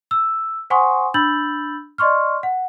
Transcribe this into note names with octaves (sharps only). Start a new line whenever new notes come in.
E6
C5 F#5 G#5 C6 C#6 D#6
D4 B5 E6 G6 A6 F#7
D5 D#5 C6 C#6 F6
F#5